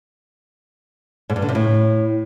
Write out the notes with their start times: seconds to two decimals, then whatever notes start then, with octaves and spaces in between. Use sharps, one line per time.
1.30 G#2
1.36 G2
1.42 D3
1.49 C3
1.55 A2